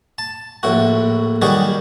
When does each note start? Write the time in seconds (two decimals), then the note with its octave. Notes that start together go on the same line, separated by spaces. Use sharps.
0.18 A5
0.63 A#1 A2 F#4
1.42 D#3 F#3 G3 F#4 G#4